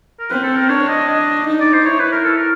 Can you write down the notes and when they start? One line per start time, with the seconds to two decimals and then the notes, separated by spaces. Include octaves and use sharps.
0.19 A#4
0.30 C4 B4
0.43 A4
0.56 A#4
0.69 D4 C#5
0.88 D#5
1.08 D#5
1.47 D#4
1.61 D5
1.73 C5
1.86 E4 C#5
1.99 B4
2.12 A#4
2.25 A4
2.38 A#4